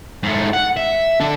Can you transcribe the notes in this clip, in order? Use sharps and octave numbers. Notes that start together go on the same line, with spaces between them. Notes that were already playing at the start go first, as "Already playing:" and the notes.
G#2 A3
F#5
E5
D4 A4